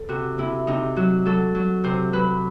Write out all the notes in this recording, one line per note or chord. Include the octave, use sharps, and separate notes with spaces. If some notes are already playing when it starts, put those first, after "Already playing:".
Already playing: A4
C3 F#4
C3 E4
C3 D#4
F#3 F#4
F#3 A4
F#3
C3 C5
F#3 B4